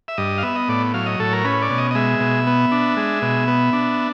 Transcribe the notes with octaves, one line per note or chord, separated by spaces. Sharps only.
E5
G2 D#5
F5
B3 E5
D#5
A2 D5
F#3 F5
D#5
A2 A4
A#4
C#4 B4
D5
B2
D#5
D#5
G#3 E5
B2
B3
D4
G#3
B2
B3
D4